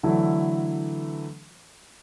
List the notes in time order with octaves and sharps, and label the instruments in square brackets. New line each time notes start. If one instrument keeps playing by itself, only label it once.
[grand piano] D3 E3 F#3 A3 D4 E4